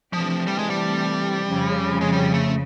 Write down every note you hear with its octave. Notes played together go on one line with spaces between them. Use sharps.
C3 E3 F3 A3 D4 G4
G3
G#3
G3
F2 C#3 F3
G#3
G3
A3